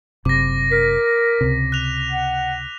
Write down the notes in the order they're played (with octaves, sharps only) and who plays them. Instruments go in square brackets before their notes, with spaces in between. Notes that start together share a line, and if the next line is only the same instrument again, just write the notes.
[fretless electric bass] F#1 C3 [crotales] D6 A#6
[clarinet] A#4 [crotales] B6
[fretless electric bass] C#2 C3
[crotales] F#6 F7
[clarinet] F#5